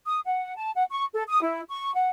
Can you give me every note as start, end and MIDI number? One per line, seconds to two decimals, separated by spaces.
0.06 0.19 87
0.27 0.55 78
0.57 0.71 81
0.75 0.84 78
0.90 1.05 85
1.13 1.23 69
1.28 1.41 87
1.42 1.62 64
1.69 1.92 85
1.94 2.10 78